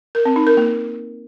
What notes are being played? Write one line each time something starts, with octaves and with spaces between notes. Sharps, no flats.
A#4
C4
D#4
A#4
A#3